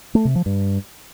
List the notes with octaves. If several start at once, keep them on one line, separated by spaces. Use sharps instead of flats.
A3
C3
F3
G2